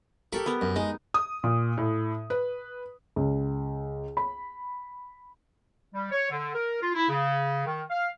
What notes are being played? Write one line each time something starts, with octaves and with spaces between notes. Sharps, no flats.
G4 A4 A#4 B5 C#6
B3 A#4
F#2
G#3 D#4
D#6
A#2
A2
B4
C#2
B5
G3
C#5
D3
A#4
F4
E4
C#3
D#3
F5